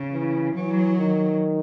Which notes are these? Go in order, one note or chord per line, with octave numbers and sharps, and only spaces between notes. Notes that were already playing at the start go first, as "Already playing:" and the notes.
Already playing: C#3
E3
E3 F#3
D#3